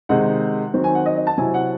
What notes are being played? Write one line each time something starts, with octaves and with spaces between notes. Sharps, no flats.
C3 D#3 G#3 D#4 F#5
D#3 F#3 C4
G#5
F#5
D#5
D#5
A5
C3 F#3 C4 E4 G#5
F#5